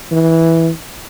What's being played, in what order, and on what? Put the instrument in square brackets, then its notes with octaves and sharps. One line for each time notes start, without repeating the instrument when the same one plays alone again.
[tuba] E3